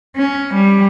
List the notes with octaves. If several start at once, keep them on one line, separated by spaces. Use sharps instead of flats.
C#4
G3